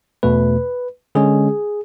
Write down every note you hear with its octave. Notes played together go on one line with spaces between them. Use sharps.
E2 B2 A3 B4
D3 G#3 C#4 G#4